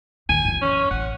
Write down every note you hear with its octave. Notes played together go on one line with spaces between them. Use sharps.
A#1 D#2 G#5
F#2 E3
C#4
A1 F#5